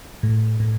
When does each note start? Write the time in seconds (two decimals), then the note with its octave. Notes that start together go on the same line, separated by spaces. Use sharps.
0.23 A2
0.60 A2